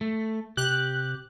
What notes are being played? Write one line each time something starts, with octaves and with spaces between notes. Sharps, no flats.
A3
C3 G4 F#6